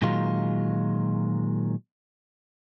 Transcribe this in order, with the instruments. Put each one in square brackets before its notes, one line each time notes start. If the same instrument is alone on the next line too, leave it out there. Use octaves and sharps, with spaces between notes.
[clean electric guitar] A#2 D#3 F#3 G#3 F4